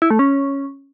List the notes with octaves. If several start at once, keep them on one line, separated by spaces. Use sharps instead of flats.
E4
A3
C#4